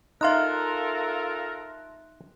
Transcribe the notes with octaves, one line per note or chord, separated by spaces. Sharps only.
D#4 F4 A4 A#4 E5 F5 C6 F#6